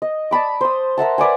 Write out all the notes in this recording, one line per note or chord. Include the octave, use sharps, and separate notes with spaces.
D#5
D5 A5 B5 D6
C5 D#6
A#4 E5 F#5 A5
B4 D5 F#5 G#5